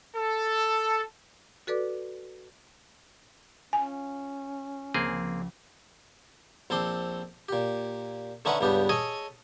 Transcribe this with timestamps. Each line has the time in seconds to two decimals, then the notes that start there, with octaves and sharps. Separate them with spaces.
0.15 A4
1.67 F#4 A4 B4 D5 D6
3.73 C#4 F4 G#5
4.94 C#2 F3 A#3 C4 G#4
6.70 A#1 C4 A4 C6 D6
7.49 A#2 G4
8.45 D3 A3 C#4 D#4 B4 F#5
8.61 C#2 G2 C#3 B3 D4 G4
8.89 G#4 A4 C#5 D#5 G#5